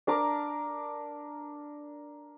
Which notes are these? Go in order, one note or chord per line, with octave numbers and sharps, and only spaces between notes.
D4 A#4 A#5 D6